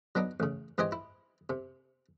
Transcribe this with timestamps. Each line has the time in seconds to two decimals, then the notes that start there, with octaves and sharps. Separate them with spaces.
0.15 F#3 B3 D4 D#4
0.40 A1 C#3
0.78 G#2 E3 C4 G4 D#5 G#5
0.92 E4
1.50 C3